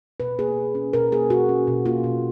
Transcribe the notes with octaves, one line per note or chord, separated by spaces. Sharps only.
B2 B4
A#3 G#4
B2
C#4
B2 A#4
A#3 G#4
B2 F#4
C#4
B2
A#3 F4
B2